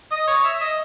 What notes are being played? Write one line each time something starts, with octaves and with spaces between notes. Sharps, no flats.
D#5
C#5
E5
D#5